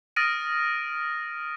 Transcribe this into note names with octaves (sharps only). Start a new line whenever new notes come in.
D#6 F6 A6 A#6 D7 D#7